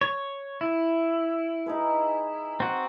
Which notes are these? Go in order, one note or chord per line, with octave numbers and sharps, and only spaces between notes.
C#5
E4
D#4 G#4 B4
C4 F#4